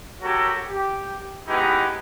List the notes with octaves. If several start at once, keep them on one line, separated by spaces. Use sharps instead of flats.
F#4 G4 A4 A#4 C#5
G4
G#3 B3 D#4 E4 G4